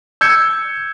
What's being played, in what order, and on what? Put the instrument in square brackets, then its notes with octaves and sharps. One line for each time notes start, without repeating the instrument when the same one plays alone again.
[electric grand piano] E6 G6 G#6 C#7